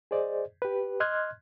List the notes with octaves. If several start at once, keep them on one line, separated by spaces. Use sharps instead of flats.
G#4 C5 D5 D#5
G4 B4
D#5 C6 F6 F#6 G#6